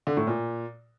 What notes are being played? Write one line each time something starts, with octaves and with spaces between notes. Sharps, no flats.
D3
A2
A#2